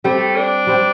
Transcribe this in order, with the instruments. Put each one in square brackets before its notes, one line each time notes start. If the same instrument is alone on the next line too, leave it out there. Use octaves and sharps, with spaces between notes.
[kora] G3 C4 G4 [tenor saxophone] A3
[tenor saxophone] D4
[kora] G3 C4 G4